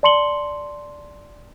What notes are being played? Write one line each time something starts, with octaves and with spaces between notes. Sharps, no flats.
D5 A5 C6 C#7 F#7 G7